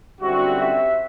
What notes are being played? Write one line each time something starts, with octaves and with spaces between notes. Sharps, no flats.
F#2 D3 G3 C4 E4 F#4
E5